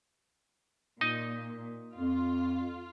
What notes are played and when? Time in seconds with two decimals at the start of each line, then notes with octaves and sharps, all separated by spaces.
1.01 A#2 D#4 D#5
1.96 F2 F4